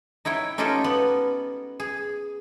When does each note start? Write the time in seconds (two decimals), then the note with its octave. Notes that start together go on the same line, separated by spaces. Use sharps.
0.25 D#4 E4 C#5 G5
0.58 C#4 D#4 F4 G4 A4 D#5
0.84 B3
1.80 G#4